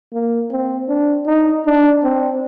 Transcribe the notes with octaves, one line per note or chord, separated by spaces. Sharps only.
A#3
C4
D4
D#4
D4
C4